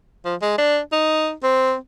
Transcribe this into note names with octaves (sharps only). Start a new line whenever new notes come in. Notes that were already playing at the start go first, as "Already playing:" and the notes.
F3
G#3
D4
D#4
C4